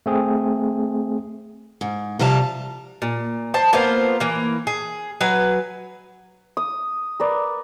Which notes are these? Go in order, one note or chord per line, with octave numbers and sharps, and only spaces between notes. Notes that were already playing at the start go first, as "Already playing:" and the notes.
A3 C4 G#4
G#2
C3 F3 G3 F5 A5
A#2
C5 A5
A#3 B3 F4 C5
E3 A#3
G#4
F#3 B4 G#5
D#6
A#4 B4 D5